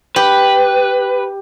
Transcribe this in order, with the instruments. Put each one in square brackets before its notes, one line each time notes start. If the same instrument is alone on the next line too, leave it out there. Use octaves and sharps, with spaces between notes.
[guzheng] G4 [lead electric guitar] B4